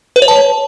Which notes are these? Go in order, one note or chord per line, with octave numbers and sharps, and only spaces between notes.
B4
C#5
A5